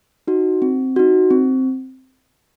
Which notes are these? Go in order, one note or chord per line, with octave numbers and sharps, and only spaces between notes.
D#4 F#4
C4
D#4 F#4
C4